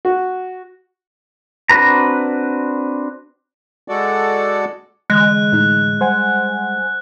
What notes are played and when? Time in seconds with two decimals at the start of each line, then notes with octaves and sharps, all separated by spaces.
0.05 F#4
1.69 C4 D4 F#4 B4 A#5
3.88 G#3 F#4 A4 D5
5.10 D3 E3 G#3 F#6
5.53 A2 D#4
6.01 G3 C5 F#5 G#5